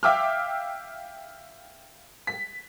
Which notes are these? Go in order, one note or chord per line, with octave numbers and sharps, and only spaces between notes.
E5 F5 G5 D6 E6 F6
B6